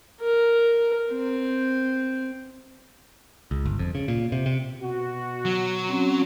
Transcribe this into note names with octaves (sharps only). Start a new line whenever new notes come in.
A#4
C4
C#2
G1
F2
C#3
A#2
C3
C3
B2 F#4
F#3
C4 C#4